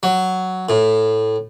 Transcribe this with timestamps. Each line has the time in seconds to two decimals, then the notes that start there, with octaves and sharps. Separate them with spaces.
0.03 F#3
0.69 A2